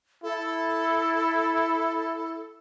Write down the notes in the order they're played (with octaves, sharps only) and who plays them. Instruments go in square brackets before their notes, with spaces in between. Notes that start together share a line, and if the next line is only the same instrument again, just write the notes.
[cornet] E4 [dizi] A4